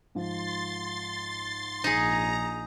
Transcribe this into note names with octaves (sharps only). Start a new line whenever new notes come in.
G#2 F3 C6 A6
A#1 D#4 G#4 A#5